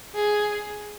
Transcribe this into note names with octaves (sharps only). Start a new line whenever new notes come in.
G#4